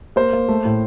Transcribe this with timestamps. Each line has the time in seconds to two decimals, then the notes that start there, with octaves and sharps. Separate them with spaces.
0.16 A#3 C5
0.33 A#3
0.48 A3
0.65 A2